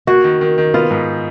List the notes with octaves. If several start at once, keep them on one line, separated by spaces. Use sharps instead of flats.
A#3 F#4
D#3
D#3
D#3
B3 F4
G#2